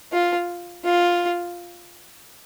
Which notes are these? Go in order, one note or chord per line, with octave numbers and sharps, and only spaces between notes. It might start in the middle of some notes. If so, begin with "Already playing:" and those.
F4
F4